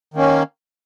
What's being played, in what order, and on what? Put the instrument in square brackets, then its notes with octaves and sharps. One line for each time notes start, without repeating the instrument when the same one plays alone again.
[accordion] D#3 A#3 C#4